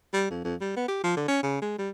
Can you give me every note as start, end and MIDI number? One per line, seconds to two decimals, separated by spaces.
0.14 0.29 55
0.30 0.43 41
0.44 0.55 41
0.61 0.76 55
0.77 0.87 59
0.88 1.02 67
1.04 1.14 53
1.17 1.28 50
1.28 1.41 61
1.43 1.61 49
1.62 1.78 56
1.79 1.90 55